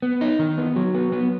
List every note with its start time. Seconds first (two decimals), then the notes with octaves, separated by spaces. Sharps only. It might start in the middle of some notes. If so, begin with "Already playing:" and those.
0.02 B3
0.21 D#4
0.39 D#3
0.58 B3
0.76 F#3
0.95 B3
1.12 B3